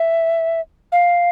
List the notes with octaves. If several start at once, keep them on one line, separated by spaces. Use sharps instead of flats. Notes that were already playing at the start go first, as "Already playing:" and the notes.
Already playing: E5
F5